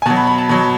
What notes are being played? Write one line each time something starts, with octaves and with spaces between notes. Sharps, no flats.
G#5
B2 F#3 A5
B5
B5
A5
B2 F#3